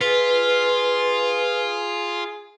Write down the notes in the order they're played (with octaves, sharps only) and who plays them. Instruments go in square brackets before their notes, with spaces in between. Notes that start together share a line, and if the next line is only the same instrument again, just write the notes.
[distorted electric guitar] F4 [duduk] G#4 [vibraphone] B4